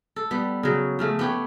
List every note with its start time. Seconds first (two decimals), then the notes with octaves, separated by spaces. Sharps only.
0.16 A4
0.31 G3 B3
0.63 C#3 F#3
0.99 C#3 F3 A3
1.19 B3 G4 C#5